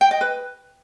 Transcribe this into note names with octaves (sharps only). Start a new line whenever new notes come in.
G5
D#5
B4